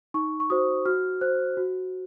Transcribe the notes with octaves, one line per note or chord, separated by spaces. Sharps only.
D#4 C#6
C#6
F#4 C5 D#6
F#4 F6
C5 F#6
F#4